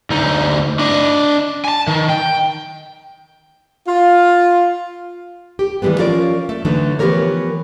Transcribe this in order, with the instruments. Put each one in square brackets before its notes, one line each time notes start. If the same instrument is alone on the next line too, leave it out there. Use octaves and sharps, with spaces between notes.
[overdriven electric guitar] D2 D#4
D4 D#5
G#5 A5
D#3
G5
[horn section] F4
[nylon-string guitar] G4
D#3 E3 G3 G#3 B3
F3 C#4 F4 A#4 D5
A3
D3 E3 F#3 A3 D#4
E3 F3 B3 G4 A#4 C#5